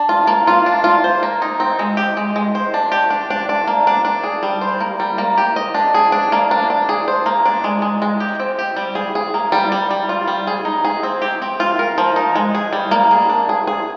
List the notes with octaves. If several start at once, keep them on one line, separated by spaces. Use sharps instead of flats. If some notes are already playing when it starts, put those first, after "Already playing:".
Already playing: D4
F4
A#3
F4
D4
F4
C5
A#3
D#4
C4
G#3
G4
G#3
G#3
C5
D4
G4
D4
D4
D4
A#3
D4
D4
G#4
G3
C5
A#3
G3
A#3
G4
D#5
D4
G#4
D4
A#3
D4
D4
G#4
C5
A#3
D4
G#3
G#3
G#3
G4
C4
G4
G3
G#4
G#4
A#3
G3
G3
G3
F4
G3
G#4
D#4
G#4
C4
G4
C4
F4
A#4
F3
D#4
G#3
G#4
G3
A#3
G#4
D4
G#4
G#4